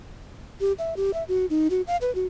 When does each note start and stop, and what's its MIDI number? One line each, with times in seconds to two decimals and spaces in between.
0.60 0.73 67
0.78 0.96 76
0.97 1.14 67
1.14 1.23 76
1.28 1.46 66
1.50 1.68 63
1.70 1.82 66
1.87 1.97 77
2.01 2.13 71
2.15 2.27 66